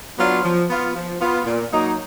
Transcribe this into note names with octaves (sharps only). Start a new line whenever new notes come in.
F#3 B3 D4 F4
F3
B3 F4
F3
B3 F4
A#2
F#3 A#3 D#4